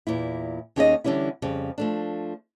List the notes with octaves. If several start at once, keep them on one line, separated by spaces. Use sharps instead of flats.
E2 A#2 E4
D#2 C#4 D#4 G#4 C#5 D#5
D3 E3 G3 C#4 E4
F2 C#3 G3
F3 A3 D4